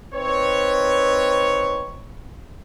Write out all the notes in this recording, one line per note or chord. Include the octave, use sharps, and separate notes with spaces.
C4 D#4 B4 C#5